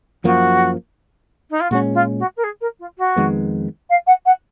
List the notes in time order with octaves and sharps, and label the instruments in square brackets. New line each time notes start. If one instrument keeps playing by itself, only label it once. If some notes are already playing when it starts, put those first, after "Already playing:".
[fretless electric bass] F#2 F3 A#3 [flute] F#4
[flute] D#4
F4
[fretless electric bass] A#2 G#3 C#4 [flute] F#4
[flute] F4
F#4
A#4
G#4
A#4
F4
F#4
[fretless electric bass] F2 D#3 G#3 B3
[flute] F5
F#5
F#5